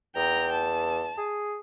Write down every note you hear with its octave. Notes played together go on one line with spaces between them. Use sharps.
E2 G5 A#5
A5
G#4